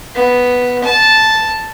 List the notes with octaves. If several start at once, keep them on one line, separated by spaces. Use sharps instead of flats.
B3
A5